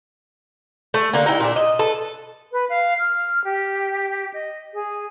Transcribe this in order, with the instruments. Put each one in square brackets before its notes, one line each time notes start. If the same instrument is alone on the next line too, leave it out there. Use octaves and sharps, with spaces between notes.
[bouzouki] A3
D3 A#3
D#4 E4 F#5 G5
A#2 D4
D#5
A4 B4
[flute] B4
F5
F6
G4
D#5
G#4